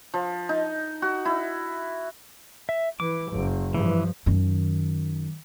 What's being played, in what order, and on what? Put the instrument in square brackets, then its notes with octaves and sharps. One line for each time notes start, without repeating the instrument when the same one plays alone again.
[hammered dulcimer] F3
D#4
F#4
E4
[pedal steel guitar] E5
[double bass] E3 [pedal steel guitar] D6
[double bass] F#1
[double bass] G2 F3 [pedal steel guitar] E3
[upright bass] F#2 D#3